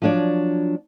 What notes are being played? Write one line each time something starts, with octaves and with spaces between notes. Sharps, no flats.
F3 F#3 D4 C#5 D5